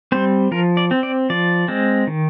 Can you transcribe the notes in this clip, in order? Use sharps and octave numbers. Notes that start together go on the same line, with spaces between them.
G3 C4 C5
F3 A#4
D5
C4
D5
F3 D5
G#3 C4
D#3